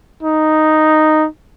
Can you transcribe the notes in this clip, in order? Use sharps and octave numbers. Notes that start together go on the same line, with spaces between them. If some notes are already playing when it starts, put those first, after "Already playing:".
D#4